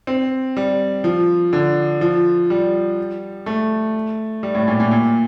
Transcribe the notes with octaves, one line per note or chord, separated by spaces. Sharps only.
C4
G3
F3
D3
F3
G3
A3
G3
A2
A#2
A#2
A#2